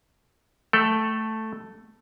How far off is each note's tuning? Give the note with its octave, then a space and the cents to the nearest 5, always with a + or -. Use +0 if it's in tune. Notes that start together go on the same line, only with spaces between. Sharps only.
A3 +0 A4 +5 G5 -20